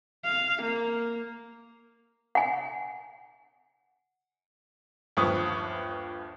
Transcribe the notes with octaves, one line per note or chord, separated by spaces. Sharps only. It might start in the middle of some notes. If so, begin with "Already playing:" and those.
F5
A#3
F#5 G#5
G1 D#2 F3 B4 C#6 D#6